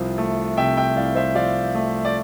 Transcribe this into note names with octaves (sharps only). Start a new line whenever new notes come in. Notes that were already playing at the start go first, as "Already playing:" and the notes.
Already playing: C2 C3 F3
A3
C3 E5 G5
E5 G5
C2 D5 F5
C5 E5
F3 D5 F5
A3
D5